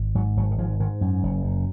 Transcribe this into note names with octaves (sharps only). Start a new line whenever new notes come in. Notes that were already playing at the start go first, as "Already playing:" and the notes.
Already playing: G#1
G#2 F#3
G#1 F#3
D#3
G#2 F3
G#2 D#3
F#2
F#1
F#2